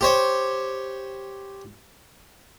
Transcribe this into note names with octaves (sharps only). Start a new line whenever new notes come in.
G4 C5 C#5